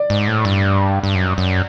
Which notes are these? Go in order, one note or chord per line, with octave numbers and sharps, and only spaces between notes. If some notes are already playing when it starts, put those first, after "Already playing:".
Already playing: D5
G#2
A2
G2
G2
F#2
F#2